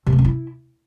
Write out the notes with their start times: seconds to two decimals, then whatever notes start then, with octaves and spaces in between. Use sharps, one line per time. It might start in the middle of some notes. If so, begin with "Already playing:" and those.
0.06 C3
0.12 A3
0.19 C4
0.25 E4